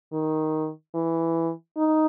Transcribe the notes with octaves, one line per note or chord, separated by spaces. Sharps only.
D#3
E3
D#4